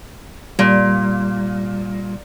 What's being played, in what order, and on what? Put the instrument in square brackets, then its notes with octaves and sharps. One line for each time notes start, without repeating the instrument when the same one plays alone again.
[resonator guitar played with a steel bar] A#2 [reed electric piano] G3